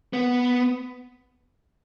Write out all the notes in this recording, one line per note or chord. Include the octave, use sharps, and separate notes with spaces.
B3